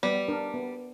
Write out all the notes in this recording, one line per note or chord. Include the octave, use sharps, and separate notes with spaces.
G3 B3
D4 A#4
B3